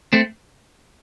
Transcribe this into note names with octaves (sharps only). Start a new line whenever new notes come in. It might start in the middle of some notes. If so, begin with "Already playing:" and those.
A3 C4